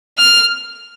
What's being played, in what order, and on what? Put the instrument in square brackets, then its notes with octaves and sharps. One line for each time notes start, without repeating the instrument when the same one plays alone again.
[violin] F6